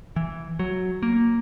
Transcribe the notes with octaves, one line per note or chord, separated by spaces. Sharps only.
E3
F#3
A#3